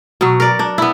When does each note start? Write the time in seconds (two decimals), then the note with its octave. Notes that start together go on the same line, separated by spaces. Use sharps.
0.21 B2 F#3
0.40 A#4 D5
0.59 D4
0.78 B3 E4